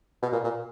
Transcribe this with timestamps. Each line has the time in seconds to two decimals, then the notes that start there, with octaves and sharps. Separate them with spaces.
0.22 B2
0.32 A#2
0.44 A#2